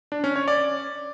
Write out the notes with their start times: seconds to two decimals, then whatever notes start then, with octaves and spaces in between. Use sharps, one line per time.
0.12 D4
0.24 C#4
0.36 C#5
0.48 D5